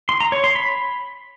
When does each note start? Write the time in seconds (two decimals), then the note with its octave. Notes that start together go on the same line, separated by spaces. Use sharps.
0.09 C6
0.20 A#5
0.32 C#5
0.44 C6
0.55 B5